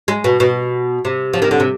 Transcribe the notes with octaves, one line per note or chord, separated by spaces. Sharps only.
G#3
B2
B2
C3
F3
D#3
D3
C3